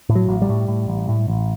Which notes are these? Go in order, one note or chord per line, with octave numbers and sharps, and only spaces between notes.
A2
F#3
A1
G3
A2
A2
A1
A2
A1